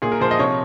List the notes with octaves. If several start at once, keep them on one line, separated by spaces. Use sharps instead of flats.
A#2 G#4
A#4
F3 C5
D#5
C3 C#5